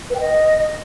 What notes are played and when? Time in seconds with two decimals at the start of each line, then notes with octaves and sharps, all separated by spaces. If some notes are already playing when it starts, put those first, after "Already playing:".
0.10 B4
0.15 G5
0.20 D#5